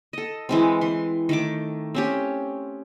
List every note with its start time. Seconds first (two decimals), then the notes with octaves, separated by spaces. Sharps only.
0.13 A4 D#5
0.49 E3 G#3 C4
0.81 E3 C6
1.29 D#3 A3 D6
1.95 C4 C#4 G4